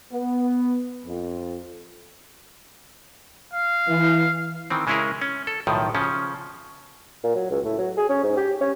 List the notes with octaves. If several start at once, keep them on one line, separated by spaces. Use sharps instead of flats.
B3
F2
F5
E3
D#3 E3 C4
C#3 G#3 C#4 E4 G#4 A#4
C#4
A4
B1 A2 D#3 F3
C#3 F3 C#4
A#2
F#3
C#2
A2
F#3
G#4
C#4
G#2
G4
C#4